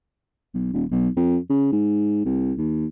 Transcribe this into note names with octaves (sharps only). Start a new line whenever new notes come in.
B1
D#1
B1
F2
C#3
G#2
C2
D#2